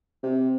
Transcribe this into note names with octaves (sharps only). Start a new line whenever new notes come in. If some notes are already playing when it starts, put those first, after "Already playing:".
C3